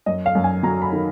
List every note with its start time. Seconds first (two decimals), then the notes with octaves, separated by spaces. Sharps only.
0.06 F#2 D#5
0.26 F5
0.35 F#2
0.44 G#5
0.63 F#3 A#5
0.82 B5
0.92 D#3